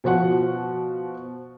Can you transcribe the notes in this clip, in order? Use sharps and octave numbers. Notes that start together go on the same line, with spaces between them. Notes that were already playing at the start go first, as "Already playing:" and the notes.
B2 F3 F#4 F#5